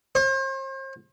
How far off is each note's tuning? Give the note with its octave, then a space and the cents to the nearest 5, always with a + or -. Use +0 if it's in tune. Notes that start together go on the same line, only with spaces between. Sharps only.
C5 +40